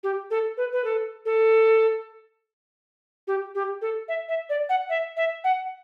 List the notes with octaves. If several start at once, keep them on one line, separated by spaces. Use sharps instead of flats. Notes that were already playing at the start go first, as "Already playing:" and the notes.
G4
A4
B4
B4
A4
A4
G4
G4
A4
E5
E5
D5
F#5
E5
E5
F#5